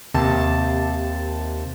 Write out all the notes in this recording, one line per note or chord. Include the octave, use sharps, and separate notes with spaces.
D#2 C3 A5